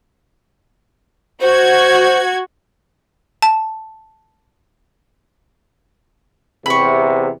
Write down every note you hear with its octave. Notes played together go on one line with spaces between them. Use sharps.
F#4 C5 G#6
A5
E2 C3 B5 C#6